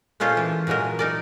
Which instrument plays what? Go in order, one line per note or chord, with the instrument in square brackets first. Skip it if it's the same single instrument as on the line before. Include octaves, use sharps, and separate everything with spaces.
[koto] A#2 G#3 C#4 F4 A4 C5
E3
A#2 E3 F#3 G#3 A#4
D#4 A#4 D5